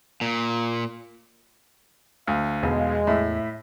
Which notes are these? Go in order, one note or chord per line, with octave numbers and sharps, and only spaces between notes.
A#2
D2 F5
B1 E2 G#3
A2 E5